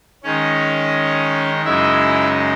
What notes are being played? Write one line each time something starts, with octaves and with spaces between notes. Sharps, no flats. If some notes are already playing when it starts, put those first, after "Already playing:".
D#3 G#3 C#4 D#4 C#5
F#2 C#3 G#3 D#4 E4 E5